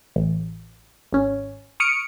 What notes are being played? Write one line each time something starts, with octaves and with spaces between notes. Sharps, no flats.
A1
G#1 C#4
C#6 D#6 F6 C#7 D7